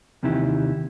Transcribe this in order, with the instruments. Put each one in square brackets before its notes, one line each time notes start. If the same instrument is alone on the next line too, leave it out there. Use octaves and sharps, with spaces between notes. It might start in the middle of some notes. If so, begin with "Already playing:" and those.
[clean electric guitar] D#2 C3 D#3 E3 E4 G4